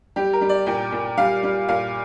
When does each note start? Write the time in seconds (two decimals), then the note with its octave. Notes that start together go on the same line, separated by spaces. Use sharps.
0.16 G3 G4
0.33 A#4
0.41 G3
0.49 D5
0.66 A#2 G5
0.92 A#2
1.17 G3 F5
1.43 G3
1.69 A#2 F5